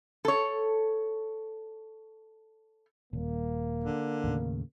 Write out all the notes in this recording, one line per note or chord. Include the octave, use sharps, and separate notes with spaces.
A4 C#5
D#1 A#3
D3
D#2 A2 C#3